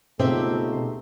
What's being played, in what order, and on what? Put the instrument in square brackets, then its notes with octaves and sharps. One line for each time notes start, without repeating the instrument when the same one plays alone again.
[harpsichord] C#2 G4 [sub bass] B2 [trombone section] A3 B3 D#4 [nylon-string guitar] C4 E5